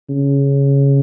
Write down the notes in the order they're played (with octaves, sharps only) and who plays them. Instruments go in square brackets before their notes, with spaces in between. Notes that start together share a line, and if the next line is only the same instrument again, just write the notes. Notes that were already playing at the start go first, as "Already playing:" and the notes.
[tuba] C#3